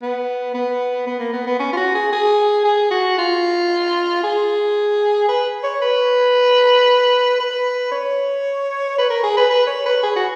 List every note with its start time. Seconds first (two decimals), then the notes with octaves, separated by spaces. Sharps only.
0.02 B3
0.54 B3
1.07 B3
1.20 A#3
1.33 B3
1.47 B3
1.59 C#4
1.73 F4
1.77 F#4
1.95 G#4
2.12 G#4
2.64 G#4
2.91 F#4
3.18 F4
4.23 G#4
5.28 B4
5.64 C#5
5.82 B4
7.40 B4
7.92 C#5
8.98 B4
9.10 A#4
9.23 G#4
9.37 B4
9.50 B4
9.67 C#5
9.86 B4
10.03 G#4
10.16 F#4